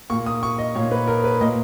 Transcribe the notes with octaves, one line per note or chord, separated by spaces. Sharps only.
A#2 A#3 C#6
D#6
C#6
D#5
A#2 A#3 C#5
B4
A#4
B4
A#2 A#3 D#5